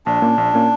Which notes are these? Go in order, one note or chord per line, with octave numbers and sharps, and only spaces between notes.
A#1 D4
A#2 A#3 C#4
A#1
A#2 A#3 C#4